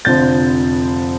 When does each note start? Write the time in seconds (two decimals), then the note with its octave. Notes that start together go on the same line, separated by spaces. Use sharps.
0.05 F1 F2 D3 F3 G6 A6